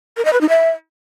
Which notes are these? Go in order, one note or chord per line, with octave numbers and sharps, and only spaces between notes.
A#4
D#5
B4
D#4
E5